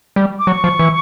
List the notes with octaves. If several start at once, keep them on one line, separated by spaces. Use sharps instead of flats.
G3
D6
F#3 C#6
F3
E3